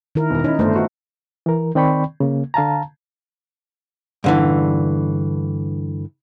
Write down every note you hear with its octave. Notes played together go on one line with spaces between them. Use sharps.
D#3 E4 A#4
E1 A#5
C#4 D#4 E4
G1 A3 D4 C5
F4 F#4 B4
E3 A#4
D#3 C4 D5 G5 B5 C#6
C#3 A#3
D3 F5 A5 A#5
G2 D3 E3